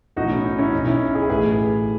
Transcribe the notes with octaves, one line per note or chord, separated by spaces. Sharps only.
B1 A2 E3 D#4 F#4
C#4 E4
D#4
C#4 E4
B1 B2 D#4
C#4 E4
E4 G#4
A1 A2 E3 G#4 B4